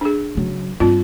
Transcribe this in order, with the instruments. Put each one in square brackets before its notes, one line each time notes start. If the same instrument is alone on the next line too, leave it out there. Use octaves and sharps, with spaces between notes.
[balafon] D4 G#4
[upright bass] C#3 F#3
[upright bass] G2 [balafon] C4 F4